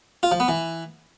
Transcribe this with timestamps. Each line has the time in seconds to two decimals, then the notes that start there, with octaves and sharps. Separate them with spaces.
0.23 F4
0.32 F3
0.40 B3
0.48 E3